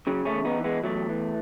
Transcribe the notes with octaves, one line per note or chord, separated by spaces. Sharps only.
C#3 F#3
A3 C#4
E2
B3 D#4
E3
G#3 B3
E2 F#3 A3
E3